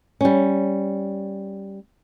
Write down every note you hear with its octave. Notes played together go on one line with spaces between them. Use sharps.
G3 C#4